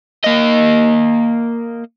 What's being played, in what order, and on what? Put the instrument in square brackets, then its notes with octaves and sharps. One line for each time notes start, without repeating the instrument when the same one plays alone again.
[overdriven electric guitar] A#3 D#5